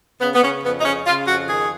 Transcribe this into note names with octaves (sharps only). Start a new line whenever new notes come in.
C#3 B3
B3
C#3 C#4
F2 B3
D#4
C#3 C#4
C#3 F4
F2 F#4
D#3 G#4